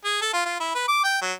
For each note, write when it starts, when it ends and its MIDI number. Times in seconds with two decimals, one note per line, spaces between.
0.05 0.20 68
0.22 0.30 69
0.33 0.43 65
0.46 0.60 65
0.60 0.74 64
0.75 0.87 71
0.88 1.03 86
1.04 1.18 79
1.22 1.33 54